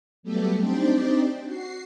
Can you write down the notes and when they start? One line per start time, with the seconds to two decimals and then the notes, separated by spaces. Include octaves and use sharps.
0.23 F#3 G3 A3 B3 G4 A4
0.60 C4 D4 D#4 G4 C5 D5
1.44 F#4 C7